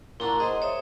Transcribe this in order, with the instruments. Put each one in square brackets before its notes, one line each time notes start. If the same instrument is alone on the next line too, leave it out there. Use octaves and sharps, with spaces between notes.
[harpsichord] A#2 D4 F#4 [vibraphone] E4 A#5
[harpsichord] G#4 C5 [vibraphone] D#5
[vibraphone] C#5 E5 D#6